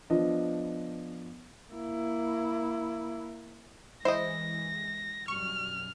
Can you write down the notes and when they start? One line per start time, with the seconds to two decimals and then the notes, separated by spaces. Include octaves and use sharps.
0.10 F3 B3 D4 D#5
1.72 A#3 E4
4.05 E3 G#3 E4 C5 D#5 A#6
5.28 F#2 B2 G3 C#6 F6